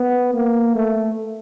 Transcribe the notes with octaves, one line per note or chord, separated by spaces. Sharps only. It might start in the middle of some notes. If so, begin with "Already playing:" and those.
Already playing: B3
A#3
A3